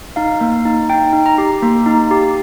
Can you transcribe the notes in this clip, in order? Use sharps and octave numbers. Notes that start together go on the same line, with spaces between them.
D#4 F5
A#3
D#4
D#4 G5
D#4
A#5
G4
A#3
D#4
G4